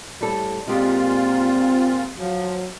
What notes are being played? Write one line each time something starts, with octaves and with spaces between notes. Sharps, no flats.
A2 G3 A4
A#2 G#3 C4 F4 G4
F3 F#3